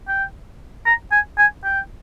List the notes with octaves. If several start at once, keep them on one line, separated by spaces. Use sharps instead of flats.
G5
A#5
G#5
G#5
G5